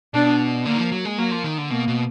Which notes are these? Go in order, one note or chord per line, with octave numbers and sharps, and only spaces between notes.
B2 D4
D3 A#3
D#3
F3
F#3
G#3
F#3 A#3
F3
D#3
D3
B2 A#3
B2